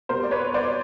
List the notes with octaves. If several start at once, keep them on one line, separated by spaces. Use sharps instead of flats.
B2 G3 A#4 C5
D5
B4 C#5
C5 D5